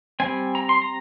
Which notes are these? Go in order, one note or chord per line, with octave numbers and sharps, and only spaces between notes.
G3 C4 G#5
A#5
C6
A#5